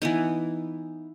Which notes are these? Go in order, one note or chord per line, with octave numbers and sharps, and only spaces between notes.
E3 B3 D#4